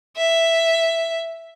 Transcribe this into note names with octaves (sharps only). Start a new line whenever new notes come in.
E5